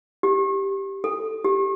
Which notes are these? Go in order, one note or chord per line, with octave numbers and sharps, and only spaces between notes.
G4
A4
G4